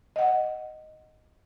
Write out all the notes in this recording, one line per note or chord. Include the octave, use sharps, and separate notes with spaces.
D#5 F#5